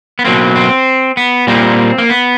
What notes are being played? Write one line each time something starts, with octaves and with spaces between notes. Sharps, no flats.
B3
B2 F#3 A#3 C4
C4
B3
A#2 G3 A#3 C4
A#3
B3